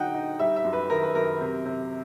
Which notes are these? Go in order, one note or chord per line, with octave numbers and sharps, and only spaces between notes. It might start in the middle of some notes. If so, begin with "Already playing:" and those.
Already playing: D3 F#3 D#4 F#5 G5
D#4
G3 E5
E5
F#2
B4
D#3 A#4
B4
F#2 A#4
C3
C3